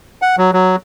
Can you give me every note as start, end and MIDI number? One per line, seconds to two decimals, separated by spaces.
0.22 0.36 78
0.38 0.51 54
0.53 0.76 54